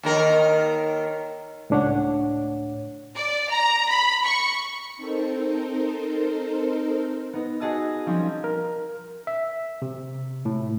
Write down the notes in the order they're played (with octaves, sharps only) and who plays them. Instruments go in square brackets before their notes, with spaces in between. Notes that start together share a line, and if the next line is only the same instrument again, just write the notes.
[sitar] D#2 D#3 A#4
[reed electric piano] C#2 A2 D4 C#5 F#5
[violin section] D5
A#5
B5
C#6
[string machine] C4 D#4 A4 A#4 C5
[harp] B3 D#4
F#4 G#4 D#5 A5 E6
F3 G3 C4 C#4 D#4
[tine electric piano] A#4
E5
C3
A2